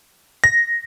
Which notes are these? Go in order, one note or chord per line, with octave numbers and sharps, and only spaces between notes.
A#6